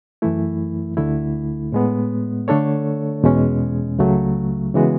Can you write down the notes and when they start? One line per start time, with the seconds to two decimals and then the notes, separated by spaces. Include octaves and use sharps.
0.22 F#2 E3 A3 E4
0.97 D2 D3 A3 E4
1.72 A2 G#3 B3
2.48 D3 A3 D4 A4 C#5
3.24 E2 B2 G#3 C#4
3.98 C#2 C#3 F#3 A3
4.74 C#3 E3 G#3 B3 F#4